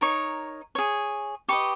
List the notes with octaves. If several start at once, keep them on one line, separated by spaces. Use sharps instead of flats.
D#4 A#4 C#5 C#6
G#4 C#5
G4 B4 D#5 C#6